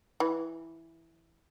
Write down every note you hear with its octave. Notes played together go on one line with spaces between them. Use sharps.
E3